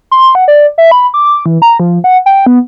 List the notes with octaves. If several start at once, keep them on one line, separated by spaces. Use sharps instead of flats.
C6
F#5
D5
E5
B5
D6
E3
A#5
F3
F#5
G5
B3